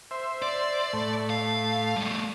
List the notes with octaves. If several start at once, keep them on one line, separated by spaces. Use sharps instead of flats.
C5 E5
D5
A2 A3
F5
G3 A3